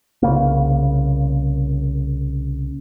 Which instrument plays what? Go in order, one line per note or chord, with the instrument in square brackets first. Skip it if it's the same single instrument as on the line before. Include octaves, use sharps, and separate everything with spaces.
[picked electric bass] C2 C#3 A#3